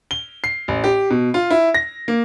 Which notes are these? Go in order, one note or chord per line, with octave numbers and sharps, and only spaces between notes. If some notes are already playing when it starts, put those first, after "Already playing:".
G7
C7
A1
G4
B2
F4
E4
A#6
A#3